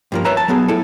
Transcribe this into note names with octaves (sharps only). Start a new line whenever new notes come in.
G2 F3 A#3
B4 C#5 E5 A#5
A5
F#3 B3 G#4
E4 A4